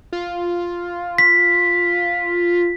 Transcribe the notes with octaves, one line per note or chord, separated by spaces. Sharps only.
F4
B6